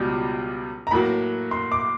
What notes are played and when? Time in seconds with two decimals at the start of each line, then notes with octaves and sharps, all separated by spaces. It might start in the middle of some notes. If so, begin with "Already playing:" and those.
Already playing: C#2 B2 G3
0.87 A#5
0.91 A2 F#3 A#3 B5
1.51 C6
1.72 D6